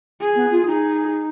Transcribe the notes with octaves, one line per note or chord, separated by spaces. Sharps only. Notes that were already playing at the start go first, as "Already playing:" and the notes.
G#4
B3
F4
D#4 G#4